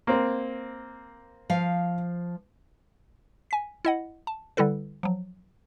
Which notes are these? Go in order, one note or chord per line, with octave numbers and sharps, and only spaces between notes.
A#3 C4
F3 F5
G#5 B6
E4 D#5 F#5
A5
D3 G3 E4 A4 B4
F3 F#3